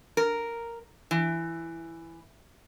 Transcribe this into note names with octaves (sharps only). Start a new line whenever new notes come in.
A#4
E3